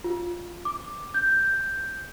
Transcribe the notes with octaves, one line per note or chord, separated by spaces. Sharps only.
F4
D6
G6